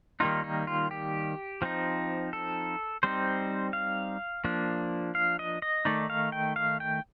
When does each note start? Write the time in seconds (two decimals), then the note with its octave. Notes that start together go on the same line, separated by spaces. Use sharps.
0.20 D#3 G3 A#3 D#4 F4
0.44 D#4
0.67 F4
0.91 G4
1.62 F3 C4 D#4
2.33 A4
3.03 G3 C4 D#4 C5
3.73 F5
4.44 F3 A#3 D4
5.15 F5
5.39 D#5
5.62 D#5
5.85 D#3 A3 D#4 D5
6.10 F5
6.32 G5
6.56 F5
6.80 G5